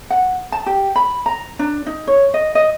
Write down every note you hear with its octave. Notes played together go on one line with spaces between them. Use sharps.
F#5
A5
G4
B5
A#5
D4
D#4
C#5
D#5
D#5